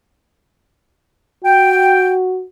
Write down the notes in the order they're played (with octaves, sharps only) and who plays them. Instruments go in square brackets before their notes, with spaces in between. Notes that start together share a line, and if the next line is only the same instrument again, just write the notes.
[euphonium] F#4 [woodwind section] G5